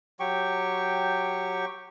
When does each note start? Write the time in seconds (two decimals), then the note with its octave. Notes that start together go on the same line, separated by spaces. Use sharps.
0.20 F#3 G4 G5 C#6